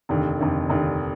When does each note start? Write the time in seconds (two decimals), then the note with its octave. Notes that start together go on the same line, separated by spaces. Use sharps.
0.09 F1 D#2 D3
0.40 F1 D#2 D3
0.69 F1 D#2 D3